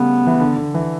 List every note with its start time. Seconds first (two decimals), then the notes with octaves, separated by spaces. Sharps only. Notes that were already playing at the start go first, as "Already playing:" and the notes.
Already playing: C#3 G3 A3 B3
0.27 E3
0.40 D3
0.56 D3
0.74 E3